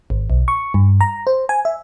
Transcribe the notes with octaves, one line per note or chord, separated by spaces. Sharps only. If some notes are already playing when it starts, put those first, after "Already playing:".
G#1
B1
C#6
G2
A#5
C5
G#5
E5